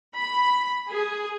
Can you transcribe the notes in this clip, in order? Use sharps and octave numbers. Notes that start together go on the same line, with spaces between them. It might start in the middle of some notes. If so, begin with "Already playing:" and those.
B5
G#4